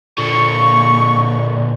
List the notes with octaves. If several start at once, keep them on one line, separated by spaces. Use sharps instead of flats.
A#2 D3 C#6